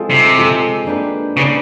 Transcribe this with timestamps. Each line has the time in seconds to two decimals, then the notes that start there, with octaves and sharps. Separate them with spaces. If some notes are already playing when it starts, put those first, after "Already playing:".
Already playing: G#3 C4 F4 A4
0.10 C3
0.36 G#3 C4 F4 A4
0.86 A#3 D4 G4 B4
1.37 C#3 A#3 D4 G4 B4